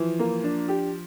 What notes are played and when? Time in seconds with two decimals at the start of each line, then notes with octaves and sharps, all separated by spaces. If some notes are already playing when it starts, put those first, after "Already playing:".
Already playing: E3 F3
0.19 A#3
0.44 D4
0.68 G4